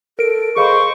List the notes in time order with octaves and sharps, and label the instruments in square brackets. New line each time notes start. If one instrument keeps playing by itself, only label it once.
[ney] A4 [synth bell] A#4 D7
[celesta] G#4 F5 B5 [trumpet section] C5 C#6 [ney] D#5